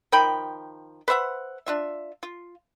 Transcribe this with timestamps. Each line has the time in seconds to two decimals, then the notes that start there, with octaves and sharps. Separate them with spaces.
0.12 D#3 F3 G5 B5
1.08 B4 C5 E5 F#5
1.66 D4 F4 E5
2.23 F4